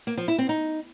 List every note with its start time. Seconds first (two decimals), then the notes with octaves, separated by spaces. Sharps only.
0.07 A#3
0.17 F3
0.28 E4
0.38 C4
0.49 D#4